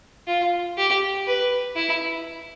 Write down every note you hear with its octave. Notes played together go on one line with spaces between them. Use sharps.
F4
G4
B4
E4